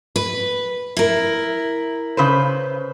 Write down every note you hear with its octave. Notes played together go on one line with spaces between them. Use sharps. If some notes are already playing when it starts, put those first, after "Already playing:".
B4
E4 A#4
C#3 B4 C5